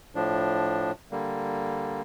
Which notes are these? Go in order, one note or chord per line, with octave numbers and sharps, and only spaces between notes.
A2 F3 D4
D3 G3 A#3